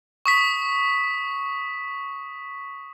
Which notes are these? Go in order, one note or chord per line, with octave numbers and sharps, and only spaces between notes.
C#6 D#6 B6